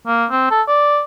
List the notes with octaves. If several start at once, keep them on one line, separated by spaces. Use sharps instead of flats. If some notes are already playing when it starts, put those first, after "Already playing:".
A#3
C4
A4
D5